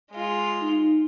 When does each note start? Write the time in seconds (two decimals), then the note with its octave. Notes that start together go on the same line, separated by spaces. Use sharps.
0.11 G#3 F4
0.61 D#4